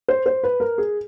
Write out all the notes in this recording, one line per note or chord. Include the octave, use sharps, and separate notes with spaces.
C5
C5
B4
A#4
G#4